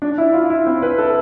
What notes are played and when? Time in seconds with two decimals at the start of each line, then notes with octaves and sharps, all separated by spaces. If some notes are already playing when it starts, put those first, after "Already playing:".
0.02 D4
0.18 E4
0.34 F4
0.50 E4
0.67 C4
0.82 B4
0.98 A4